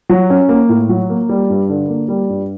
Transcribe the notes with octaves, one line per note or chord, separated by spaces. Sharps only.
F#3
C#4
A#3
A2
F#3
A#3
G3
G2
D3
A#3
G3
G2